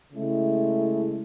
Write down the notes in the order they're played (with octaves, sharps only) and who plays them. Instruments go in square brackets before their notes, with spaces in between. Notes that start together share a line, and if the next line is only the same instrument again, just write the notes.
[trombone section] C#3 G#3 A3 E4